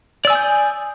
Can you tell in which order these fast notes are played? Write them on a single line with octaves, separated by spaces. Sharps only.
D5 E6 G#5 D#6 G6